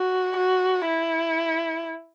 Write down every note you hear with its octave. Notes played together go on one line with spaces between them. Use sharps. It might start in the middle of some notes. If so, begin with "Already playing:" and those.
Already playing: F#4
F#4
E4